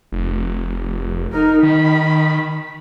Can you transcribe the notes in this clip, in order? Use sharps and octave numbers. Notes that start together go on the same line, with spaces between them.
F1
D#4 A#4
D#3 B5